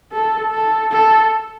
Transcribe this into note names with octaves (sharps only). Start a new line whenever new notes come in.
A4
A4
A4